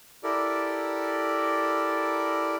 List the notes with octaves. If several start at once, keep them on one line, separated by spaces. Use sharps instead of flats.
E4 G4 A4 A#4 D5